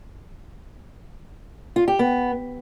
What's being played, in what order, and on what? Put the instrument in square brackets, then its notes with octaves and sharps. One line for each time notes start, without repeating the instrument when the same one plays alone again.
[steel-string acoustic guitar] F4
G4
B3